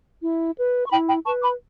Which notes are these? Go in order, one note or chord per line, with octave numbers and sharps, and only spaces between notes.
E4
B4
C#6
E4 G5 B5
G5 B5
B4 A5 C#6
B5 D6